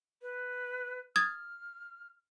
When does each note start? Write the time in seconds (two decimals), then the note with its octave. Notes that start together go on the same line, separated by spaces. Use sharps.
0.22 B4
1.16 D#6 F6 G#6 A6